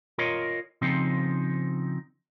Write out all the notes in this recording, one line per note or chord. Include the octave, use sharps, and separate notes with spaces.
F4 A#4 C#5 D#5
C#3 F3 C4 D#4